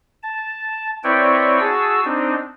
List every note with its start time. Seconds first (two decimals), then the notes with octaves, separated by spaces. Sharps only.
0.23 A5
1.04 C4 E4 B4 C#5 D5 G5
1.60 F#4 G#4 A5 E6
2.04 C4 D4 D#4